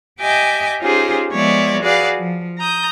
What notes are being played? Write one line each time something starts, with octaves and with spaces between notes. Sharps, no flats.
G4 D#5 E5 G5 G#5 D6
C#4 D#4 F4 G4 G#4 C5
F3 G#3 B3 C#5 D5 E5
F#4 G#4 B4 D5 F5
F3
A#5 D#6 G6